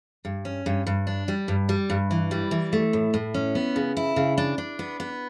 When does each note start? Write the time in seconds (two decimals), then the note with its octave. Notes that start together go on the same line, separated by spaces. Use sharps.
0.25 G2
0.45 C#4
0.66 G2
0.87 G2
1.07 D4
1.28 G3
1.48 G2
1.69 G3
1.90 G2
2.11 E3
2.31 G3
2.51 E3
2.73 A3
2.93 A2
3.14 A2
3.34 C#4
3.55 B3
3.76 C#3
3.97 E4
4.16 C#3
4.38 D4
4.58 D4
4.79 B3
5.00 B3